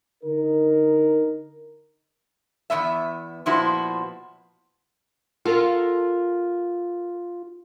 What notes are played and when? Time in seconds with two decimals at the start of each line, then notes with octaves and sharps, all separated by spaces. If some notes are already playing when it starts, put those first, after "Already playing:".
0.24 D3 D#4 A#4
2.70 E2 D#3 B3 E5
3.46 A#2 F3 B3 E4 F#4 C5
5.45 F4 A4 A#4 F#5